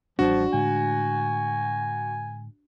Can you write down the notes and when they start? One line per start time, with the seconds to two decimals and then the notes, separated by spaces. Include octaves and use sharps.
0.19 A1 F3 G3 D4 F#4
0.53 A2 D3 G#3 G#5